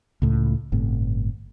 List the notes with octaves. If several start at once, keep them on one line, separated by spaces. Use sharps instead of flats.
C#2 A2
G1 A2 C3